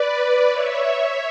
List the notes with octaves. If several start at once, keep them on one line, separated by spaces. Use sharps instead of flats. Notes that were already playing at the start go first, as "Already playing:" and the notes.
Already playing: B4 D5
C#5 E5